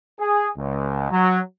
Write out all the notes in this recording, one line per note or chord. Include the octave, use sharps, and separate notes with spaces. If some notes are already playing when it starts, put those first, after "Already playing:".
G#4
C#2
F#3